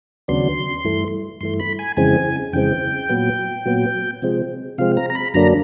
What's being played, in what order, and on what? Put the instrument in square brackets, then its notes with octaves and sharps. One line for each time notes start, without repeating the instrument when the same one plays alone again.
[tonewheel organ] D#2 C#3 F#3 B3 D4 C6
G2 E3 A3
G2 E3 A3 C6
B5
G#5
F2 C#3 E3 G#3 C4 G#5
F2 C#3 E3 G#3 C4 G5
A#2 F#3 B3
A#2 F#3 B3
C3 F3 G#3 C4
C3 F3 G#3 C4 F5
A#5
A#5
B5
F#2 D3 F#3 A#3 D4 A#5